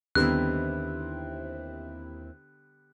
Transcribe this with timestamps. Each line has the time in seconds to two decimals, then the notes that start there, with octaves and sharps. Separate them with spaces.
0.15 D#2 D3 G3 B3 C4 E4 F#6